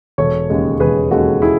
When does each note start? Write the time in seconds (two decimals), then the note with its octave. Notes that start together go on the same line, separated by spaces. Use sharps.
0.18 E1 A4 C#5
0.50 D#2 C#3 G#3
0.80 E1 G#4 B4
1.11 D#2 C#3 G#3 F#4 A4
1.42 E4 G#4